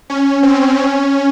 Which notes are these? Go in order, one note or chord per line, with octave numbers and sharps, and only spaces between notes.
C#4
C4
C#4